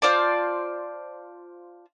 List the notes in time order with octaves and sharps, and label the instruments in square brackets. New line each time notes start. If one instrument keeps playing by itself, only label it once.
[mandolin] F4 C5 D5 A5